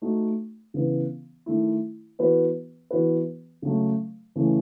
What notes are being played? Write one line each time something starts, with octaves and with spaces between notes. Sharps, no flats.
A3 D#4 F#4
C#3 E3 B3
D#3 A3 E4
E3 B3 F#4 B4
E3 B3 F#4 B4
C#3 F#3 A3
C#3 E3 A3 C#4